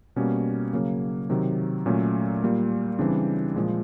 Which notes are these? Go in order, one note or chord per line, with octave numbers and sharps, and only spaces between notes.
B2 G3 A#3 C#4
C#3 F#3 A#3
C3 D#3 F#3
A#2 F#3 A3 C#4
A#2 G3 A#3
C#3 E3 G3 C4 D4
A#2 F3 G#3